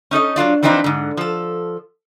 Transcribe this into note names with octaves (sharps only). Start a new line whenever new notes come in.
C#4 D#4 A4 D#5
F#3 D4 F4 D5
E3 F3 C4 D4 D#4
G#2 D3
F3 A4